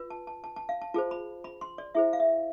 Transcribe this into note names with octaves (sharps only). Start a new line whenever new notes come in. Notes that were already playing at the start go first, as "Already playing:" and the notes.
Already playing: F4 B4
A5
A5
A5
A5
F5
A5
F4 G#4 C5 A5
B5
B5
C6
D5
E4 G#4 C5 E5
F5
E5